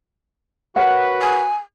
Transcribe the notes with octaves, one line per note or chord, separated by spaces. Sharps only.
F#4 A#4 B4 C#5 F#5
G#5